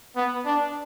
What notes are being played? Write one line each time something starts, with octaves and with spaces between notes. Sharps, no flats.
B3
D4